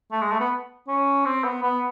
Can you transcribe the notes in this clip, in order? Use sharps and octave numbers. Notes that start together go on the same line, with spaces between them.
A3
G#3
A3
B3
C#4
C4
B3
B3